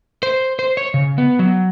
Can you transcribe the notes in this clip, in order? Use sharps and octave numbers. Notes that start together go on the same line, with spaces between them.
C5
C5
C#5
C#3
B3
F#3